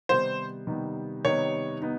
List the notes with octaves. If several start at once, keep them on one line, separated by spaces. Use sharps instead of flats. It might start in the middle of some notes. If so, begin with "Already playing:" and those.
C3 D#3 G3 B3 D#4 C5
C3 D#3 G3 B3 D#4
C3 D#3 G3 B3 D#4 C#5
B3 D#4